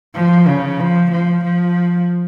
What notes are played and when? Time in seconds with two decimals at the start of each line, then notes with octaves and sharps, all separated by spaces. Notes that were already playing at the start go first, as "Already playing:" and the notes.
0.15 F3
0.47 C#3
0.79 F3
1.11 F3
1.44 F3